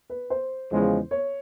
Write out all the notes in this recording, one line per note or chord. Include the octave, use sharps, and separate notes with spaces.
B4
C5
E2 C#3 F3 G#3
C#5